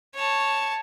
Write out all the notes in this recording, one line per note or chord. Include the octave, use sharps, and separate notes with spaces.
C#5 A5